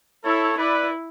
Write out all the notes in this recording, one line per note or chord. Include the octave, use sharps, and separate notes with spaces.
E4 A4 C#5
E4 B4 D5